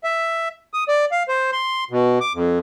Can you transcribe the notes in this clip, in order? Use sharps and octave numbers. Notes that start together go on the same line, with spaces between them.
E5
D#6
D5
F5
C5
C6
B2
D6
F2